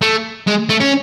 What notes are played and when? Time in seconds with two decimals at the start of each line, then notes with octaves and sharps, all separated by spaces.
0.02 A3
0.47 G#3
0.70 A3
0.81 C#4